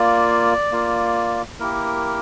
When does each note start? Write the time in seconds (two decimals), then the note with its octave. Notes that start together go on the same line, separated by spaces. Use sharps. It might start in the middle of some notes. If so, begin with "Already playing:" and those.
Already playing: A#3 F4 D5
0.72 A#3 F4
1.60 A#3 E4 G4 A#4